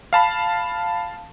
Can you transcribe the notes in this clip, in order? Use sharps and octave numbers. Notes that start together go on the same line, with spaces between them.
F5 A5 B5